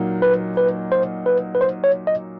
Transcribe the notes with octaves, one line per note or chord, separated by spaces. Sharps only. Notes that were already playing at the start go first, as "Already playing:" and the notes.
Already playing: A#2 F#3 A#3 D#4
B4
B4
C5
B4
B4
C5
C#5
D#5